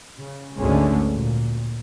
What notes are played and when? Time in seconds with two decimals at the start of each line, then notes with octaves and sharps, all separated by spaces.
0.17 C#3
0.58 G#1 D2 D3 G#3 A3 C#4
1.12 A#2